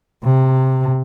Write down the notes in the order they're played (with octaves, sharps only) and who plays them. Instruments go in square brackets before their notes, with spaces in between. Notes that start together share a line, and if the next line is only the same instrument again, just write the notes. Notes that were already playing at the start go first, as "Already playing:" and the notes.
[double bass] C3